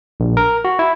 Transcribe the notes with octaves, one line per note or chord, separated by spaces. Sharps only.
A#1
A#4
F#4
E4